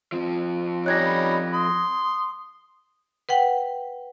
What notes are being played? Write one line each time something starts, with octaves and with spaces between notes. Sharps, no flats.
F2 F3
G3 C#4 D#4 C#5 F#6 G#6 A#6
B5
C6 D#6
B4 F#5 G5